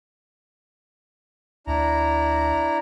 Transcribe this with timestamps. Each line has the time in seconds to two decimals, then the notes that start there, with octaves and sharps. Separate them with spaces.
1.67 D2 D4 E4 A#5